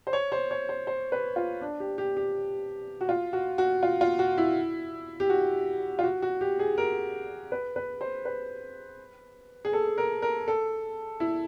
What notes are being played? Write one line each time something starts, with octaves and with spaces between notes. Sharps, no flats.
C5
C#5
C5
C#5
C5
C5
B4
F4
D4
G4
G4
G4
F#4
F4
F#4
F#4
F4
F4
F#4
E4
G4
F#4
F4
F#4
F#4
G4
G#4
A#4
B4
B4
C5
B4
G#4
A4
A#4
A#4
A4
E4